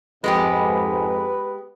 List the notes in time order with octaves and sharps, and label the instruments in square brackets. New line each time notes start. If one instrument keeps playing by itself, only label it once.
[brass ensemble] F2 G#2 [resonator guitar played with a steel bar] G#3 B3 G4 [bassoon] B4